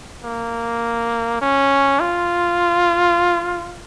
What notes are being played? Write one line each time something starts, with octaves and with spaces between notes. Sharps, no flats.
A#3
C#4
F4